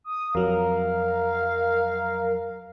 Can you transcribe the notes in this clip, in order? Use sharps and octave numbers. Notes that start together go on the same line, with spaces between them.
D#6
F2 F#3 A#4 F5